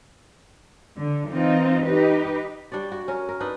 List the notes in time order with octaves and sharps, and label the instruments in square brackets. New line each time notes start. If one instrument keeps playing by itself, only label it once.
[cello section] D3
E3 C4 D#4 F4
D#4 G4 B4
[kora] G3 D4 C#5 D5
F#4
C#4 A#4
A#4
D4 D#4 B4